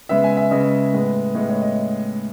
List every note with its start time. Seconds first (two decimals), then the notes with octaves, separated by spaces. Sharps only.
0.09 C#3 G#3 B3 E5
0.24 G#5
0.37 E5
0.51 C#3 G#3 B3 D#5
0.93 A2 G#3 B3
1.35 A2 G#3 B3 D#5
1.49 C#5
1.62 D#5